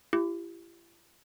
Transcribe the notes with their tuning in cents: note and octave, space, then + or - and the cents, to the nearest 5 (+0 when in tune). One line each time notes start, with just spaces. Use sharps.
E4 +45 G4 +0